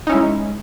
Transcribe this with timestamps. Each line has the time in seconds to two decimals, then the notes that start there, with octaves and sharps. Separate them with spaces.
0.07 D#4
0.09 C#4
0.12 E4
0.14 G#3